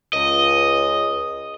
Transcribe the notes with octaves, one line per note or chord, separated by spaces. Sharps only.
C#2 D#5